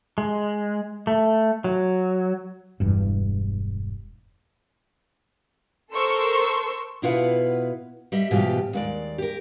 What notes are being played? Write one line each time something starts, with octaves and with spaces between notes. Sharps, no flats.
G#3
A3
F#3
E1 E2 G2
A4 A#4 C5 C6 C#6 E6
B2 E4 F4 B4 F#5
G3 D#5 E5
G#2 B2 E3 G3 F4 G4
D#2 G#3 D5
G4 A#4